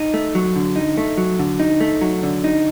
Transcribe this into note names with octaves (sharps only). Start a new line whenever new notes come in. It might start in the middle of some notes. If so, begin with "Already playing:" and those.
Already playing: D#4
A3
F#3
D3
D#4
A3
F#3
D3
D#4
A3
F#3
D3
D#4